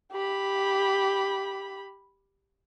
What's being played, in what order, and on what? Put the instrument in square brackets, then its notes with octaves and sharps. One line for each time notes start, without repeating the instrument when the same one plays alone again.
[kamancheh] G4 B5